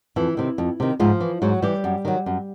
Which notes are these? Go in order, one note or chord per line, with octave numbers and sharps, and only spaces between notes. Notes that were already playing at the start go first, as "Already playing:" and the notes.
F2 E3 E4
C3 D#3
F2
C3 D#3
G#2 F3 F4
E3
G#2 F#3 F#4
E3 G3 G4
F#2
D#3 F#3
F#2